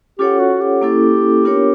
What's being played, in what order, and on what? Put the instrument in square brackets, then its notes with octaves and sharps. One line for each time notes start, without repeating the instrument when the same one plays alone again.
[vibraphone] C#4 F4 A4 C#5 F#5 [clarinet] G4
[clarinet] F#4
G4
[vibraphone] A#3 C#4 E4 A4
B3 D4 F4 A#4 C#5